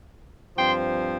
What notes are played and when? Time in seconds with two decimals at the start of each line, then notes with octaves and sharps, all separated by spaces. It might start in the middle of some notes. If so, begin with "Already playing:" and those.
0.57 G2 F3 C4 G5 C6